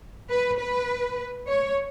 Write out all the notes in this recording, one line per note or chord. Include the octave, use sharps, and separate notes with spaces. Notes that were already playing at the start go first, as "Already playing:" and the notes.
B4
B4
C#5